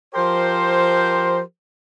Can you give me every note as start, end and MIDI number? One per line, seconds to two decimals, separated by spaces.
0.14 1.39 53
0.14 1.39 67
0.14 1.39 70
0.14 1.39 72